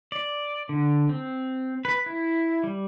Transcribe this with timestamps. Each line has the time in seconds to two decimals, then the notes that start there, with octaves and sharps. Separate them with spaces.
0.12 D5
0.69 D3
1.09 C4
1.85 B4
2.06 E4
2.64 G3